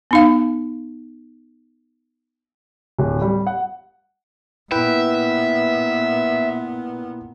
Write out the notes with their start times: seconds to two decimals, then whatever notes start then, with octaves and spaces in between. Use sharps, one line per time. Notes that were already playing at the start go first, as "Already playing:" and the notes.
0.11 B3 D#4 F5
2.99 D1
3.22 G3
3.47 F#5
4.72 A#2 B3 E4 B4 E5 G5